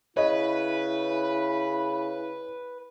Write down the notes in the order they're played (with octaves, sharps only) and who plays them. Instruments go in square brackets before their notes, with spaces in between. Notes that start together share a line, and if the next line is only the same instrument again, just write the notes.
[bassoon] C#3 [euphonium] E4 [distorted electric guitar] B4 [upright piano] C#5 D#5